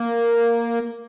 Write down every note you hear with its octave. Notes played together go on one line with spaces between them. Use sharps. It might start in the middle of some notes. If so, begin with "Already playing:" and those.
Already playing: A#3